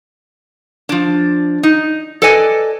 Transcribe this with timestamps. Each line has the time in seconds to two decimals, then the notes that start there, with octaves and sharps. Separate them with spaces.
0.89 F3 D4
1.63 D#4
2.22 A4 B4 D5 D#5 G#5